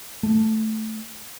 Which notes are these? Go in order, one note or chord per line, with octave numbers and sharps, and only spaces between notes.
A3